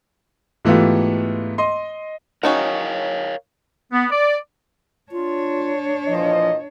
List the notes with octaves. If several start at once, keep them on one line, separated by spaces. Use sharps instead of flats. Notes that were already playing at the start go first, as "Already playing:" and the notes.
G#2 E3 A3 B3 F4 G4
D#5 C6
C#4 D#4 F#4 A#4 C#5 F5
B3
D5
D4 F4 C#5
A#2 E3 F3 D#5